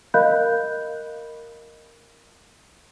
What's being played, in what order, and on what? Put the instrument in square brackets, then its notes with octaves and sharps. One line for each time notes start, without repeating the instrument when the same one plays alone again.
[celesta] A#4 D#5 F5 B5 F#6 G6